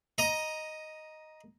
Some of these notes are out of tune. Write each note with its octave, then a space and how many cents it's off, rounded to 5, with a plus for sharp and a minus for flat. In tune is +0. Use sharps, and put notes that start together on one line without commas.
D#5 +0 A#5 +15